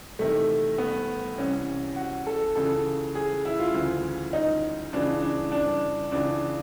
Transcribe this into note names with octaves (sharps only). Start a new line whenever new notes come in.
E2 C3 D#3 A3
B3
C2 C3 E3 C#4
F#4
A4
C#2 C#3 E3 A4
G#4
E4
F4
D2 C#3 E3
D#4
C#2 C#3 E3 D4
D4
D4
C#2 C#3 E3 D4